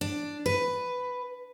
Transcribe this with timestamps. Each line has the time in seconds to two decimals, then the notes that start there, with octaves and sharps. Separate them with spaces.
0.01 D4
0.46 B4